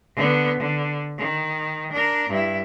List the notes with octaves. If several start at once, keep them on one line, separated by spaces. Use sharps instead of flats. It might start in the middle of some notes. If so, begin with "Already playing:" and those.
D3 B3
D3
D#3
D4 A#4
G2 E4